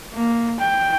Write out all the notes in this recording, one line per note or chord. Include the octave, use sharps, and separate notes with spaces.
A#3
G5